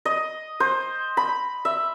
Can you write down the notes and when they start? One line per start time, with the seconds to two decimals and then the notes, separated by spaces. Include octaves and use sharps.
0.05 D#5
0.60 C5
1.17 B5
1.65 E5